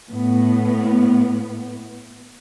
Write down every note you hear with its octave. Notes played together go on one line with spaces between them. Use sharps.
A2 B3